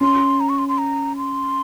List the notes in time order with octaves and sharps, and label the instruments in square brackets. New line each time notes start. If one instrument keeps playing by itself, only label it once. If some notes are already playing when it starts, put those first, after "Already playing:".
[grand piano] C#4 [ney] C6
[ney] A#5
C#6
C6
C6
A#5
C6